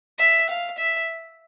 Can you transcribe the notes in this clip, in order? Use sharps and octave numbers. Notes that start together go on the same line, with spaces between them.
E5
F5
E5